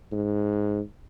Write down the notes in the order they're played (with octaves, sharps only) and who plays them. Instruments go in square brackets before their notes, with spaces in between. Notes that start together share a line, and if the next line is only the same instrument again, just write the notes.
[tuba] G#2